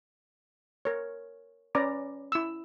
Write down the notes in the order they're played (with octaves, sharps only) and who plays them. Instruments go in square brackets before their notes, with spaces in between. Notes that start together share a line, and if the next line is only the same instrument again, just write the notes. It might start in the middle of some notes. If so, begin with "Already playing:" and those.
[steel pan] A#4 C#5
C#4 B4 D5 A#5 D6
E4 E6